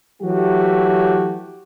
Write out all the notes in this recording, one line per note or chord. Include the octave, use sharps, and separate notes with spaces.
E3 F#3 A3 F#4 G4